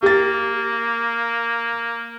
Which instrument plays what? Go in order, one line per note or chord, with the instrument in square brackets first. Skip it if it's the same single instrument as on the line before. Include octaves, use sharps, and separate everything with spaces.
[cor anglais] A#3 [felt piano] G4 A6